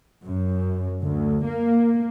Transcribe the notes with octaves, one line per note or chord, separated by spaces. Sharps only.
F#2
D2
A#3